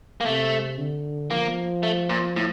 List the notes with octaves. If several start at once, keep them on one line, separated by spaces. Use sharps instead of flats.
A#3
C3 A3
D3
F3 A#3
A3
A#2
A2